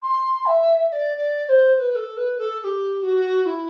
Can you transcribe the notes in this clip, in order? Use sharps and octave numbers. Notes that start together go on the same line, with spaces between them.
C6
E5
E5
D5
D5
D5
C5
C5
B4
A4
B4
A4
A4
G4
F#4
E4